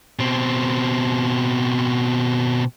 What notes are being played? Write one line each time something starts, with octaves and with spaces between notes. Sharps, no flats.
B2 C4